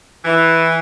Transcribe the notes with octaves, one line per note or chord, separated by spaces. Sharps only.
E3